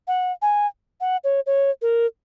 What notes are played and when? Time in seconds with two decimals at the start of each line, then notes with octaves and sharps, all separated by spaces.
0.08 F#5
0.42 G#5
1.01 F#5
1.24 C#5
1.46 C#5
1.82 A#4